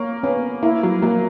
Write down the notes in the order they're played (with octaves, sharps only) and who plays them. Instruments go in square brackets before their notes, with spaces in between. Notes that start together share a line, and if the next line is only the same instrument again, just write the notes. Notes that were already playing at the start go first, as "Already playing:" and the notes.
Already playing: [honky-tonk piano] A#3 [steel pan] C#5
[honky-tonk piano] B3 [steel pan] C#4
[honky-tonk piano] A#3 [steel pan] E4
[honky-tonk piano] F#3
[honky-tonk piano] F#3 [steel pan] A#3